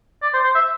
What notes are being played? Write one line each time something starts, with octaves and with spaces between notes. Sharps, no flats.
D5
C5
C5
E5